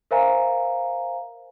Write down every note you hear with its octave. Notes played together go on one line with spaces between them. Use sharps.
A#4 C5 E5 F5 G#5 A#5